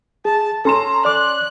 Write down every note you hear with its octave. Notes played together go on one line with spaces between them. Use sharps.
G#4 A5
C#4 A4 A#5 C6 E7
D5 D6 F#6